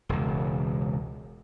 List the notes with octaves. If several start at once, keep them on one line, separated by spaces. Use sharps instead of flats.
E1 C#2